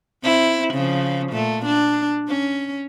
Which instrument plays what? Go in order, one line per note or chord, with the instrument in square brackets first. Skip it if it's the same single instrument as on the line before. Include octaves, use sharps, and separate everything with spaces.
[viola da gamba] C4 E4
C#3 F3
A#2 A3
D4
C#4